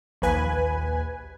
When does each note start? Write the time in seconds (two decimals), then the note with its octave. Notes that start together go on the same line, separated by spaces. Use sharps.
0.22 A#1 D#2 B4 G#5